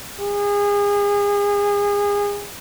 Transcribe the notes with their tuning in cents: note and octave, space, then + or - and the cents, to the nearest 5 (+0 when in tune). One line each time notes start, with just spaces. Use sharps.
G#4 -30